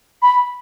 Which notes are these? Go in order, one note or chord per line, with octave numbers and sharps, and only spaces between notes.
B5